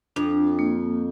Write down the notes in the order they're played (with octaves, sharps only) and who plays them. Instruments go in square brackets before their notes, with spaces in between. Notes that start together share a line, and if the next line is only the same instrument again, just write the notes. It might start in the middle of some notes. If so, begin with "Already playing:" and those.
[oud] F2 [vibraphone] D4
[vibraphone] A#3